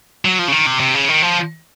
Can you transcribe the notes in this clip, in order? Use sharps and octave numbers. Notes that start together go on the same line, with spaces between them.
F#3
F3
C#3
D#3
C3
C3
C#3
D#3
F3